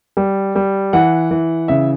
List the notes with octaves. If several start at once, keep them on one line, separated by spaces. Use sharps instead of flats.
G3
G3
E3 F#5
E3
C#3 E5